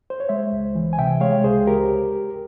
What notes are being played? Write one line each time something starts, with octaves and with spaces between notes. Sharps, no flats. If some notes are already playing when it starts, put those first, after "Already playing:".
C5
C#5
G#3 C5 E5
C#2
E3
G#5
C3 E5 G5
G#3 C#5 F5
C#2 G#4 C5
G4 A#4